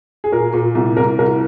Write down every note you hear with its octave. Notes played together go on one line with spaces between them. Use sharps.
G#4
A#2 A#4
A#2
C2
C2 A#4
C2 A#4